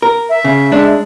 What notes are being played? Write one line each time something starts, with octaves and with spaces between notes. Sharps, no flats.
A#4
E5
C#3
G#3 D4